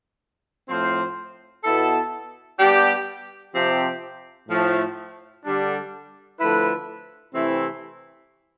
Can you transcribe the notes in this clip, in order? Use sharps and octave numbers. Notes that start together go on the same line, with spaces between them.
A2 F3 C4 F4 C5
B2 B3 E4 A4
G3 B3 D4 G4
C3 F3 C4 G4
A2 F3 A3
D3 G3 D4
D3 F3 A3 E4 B4
C3 E3 A3 C4 E4